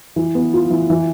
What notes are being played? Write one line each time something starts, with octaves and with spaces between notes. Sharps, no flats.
E3
B3
F4
E3
E3